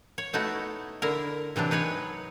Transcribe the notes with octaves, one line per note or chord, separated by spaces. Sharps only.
C#5
B2 A3 D#4 E4 F#4
D3 E4 A#4
C3 E3 F#3 D4
D#4 B4 C#5 G#5